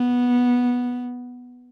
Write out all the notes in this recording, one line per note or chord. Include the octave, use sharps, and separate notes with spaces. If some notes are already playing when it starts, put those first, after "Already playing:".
Already playing: B3